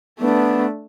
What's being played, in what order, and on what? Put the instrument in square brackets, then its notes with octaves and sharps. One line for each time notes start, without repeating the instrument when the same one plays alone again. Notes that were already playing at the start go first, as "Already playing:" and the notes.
[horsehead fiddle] A3 D4 [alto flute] B3